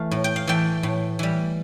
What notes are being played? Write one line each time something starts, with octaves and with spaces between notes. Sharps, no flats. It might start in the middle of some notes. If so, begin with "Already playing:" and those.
Already playing: E3 A3 F5
A2
G5
F5
E3 A3 G5
A2
E3 G3